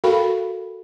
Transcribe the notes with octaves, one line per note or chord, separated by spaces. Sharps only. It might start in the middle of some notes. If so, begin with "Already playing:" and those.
F#4 A4 A#4 F5 G5 B5